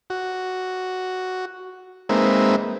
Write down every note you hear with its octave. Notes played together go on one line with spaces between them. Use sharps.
F#4
G#3 A#3 C4 D#4 B4 E5